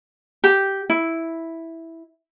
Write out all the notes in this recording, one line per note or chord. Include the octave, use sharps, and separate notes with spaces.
G4
E4